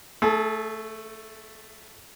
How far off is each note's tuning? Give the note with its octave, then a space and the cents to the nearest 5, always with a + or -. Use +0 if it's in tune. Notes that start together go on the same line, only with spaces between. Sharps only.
A3 +5 G#4 +45